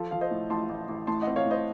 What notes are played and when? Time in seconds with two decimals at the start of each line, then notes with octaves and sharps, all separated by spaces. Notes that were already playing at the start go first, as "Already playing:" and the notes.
Already playing: F3 F4 A4
0.11 F3 F5
0.21 C5 D#5
0.31 A2
0.50 A1 A5 C6
0.69 A1
0.89 A1
1.07 A2 A5 C6
1.22 D#5 F#5
1.27 C4
1.36 C#5 F5
1.46 A2
1.51 C5 D#5